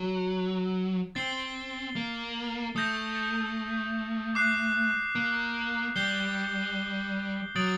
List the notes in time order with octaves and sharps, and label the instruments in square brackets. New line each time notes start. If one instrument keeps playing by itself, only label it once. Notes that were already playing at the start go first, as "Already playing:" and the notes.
Already playing: [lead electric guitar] F#3
[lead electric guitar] C4 [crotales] A6 C7 G7
[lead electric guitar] A#3
[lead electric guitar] A3 [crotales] D#6 G6 A#6
[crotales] D6 F#6 C7
[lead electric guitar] A#3
[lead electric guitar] G3 [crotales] G6 C7 G7
[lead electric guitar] F#3 [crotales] D#6 A6 D7 F#7